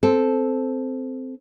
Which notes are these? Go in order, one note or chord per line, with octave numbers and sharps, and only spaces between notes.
C4 A4